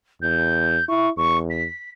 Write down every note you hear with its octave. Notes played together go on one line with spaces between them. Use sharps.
E2 G6
E4 C#6
E2 C#6
B6